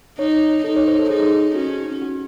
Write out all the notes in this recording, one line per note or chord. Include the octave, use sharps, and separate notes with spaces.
D#4 C#5
D#4 A4
C#5
C5
A4
D#4 G#4
C#4 F#4
F#4